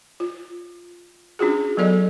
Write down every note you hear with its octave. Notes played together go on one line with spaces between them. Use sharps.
F4
C#4 D4 F4 F#4 G#4
F#3 B3 A4 D5 D#5